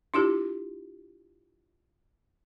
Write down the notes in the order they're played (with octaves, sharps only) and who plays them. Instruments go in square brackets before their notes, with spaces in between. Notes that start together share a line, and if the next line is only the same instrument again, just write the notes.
[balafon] D4 E4 F4 G4